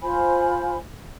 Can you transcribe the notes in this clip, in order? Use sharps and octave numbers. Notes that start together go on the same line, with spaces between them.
F4 C5 G#5 B5